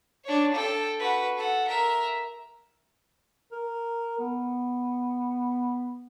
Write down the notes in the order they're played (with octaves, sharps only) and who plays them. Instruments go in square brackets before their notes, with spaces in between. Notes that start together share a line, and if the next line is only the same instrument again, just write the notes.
[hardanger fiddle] D4 C#5
A4 G5
F#4 B4
A4 F#5
A#4 E5
[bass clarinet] A#4
B3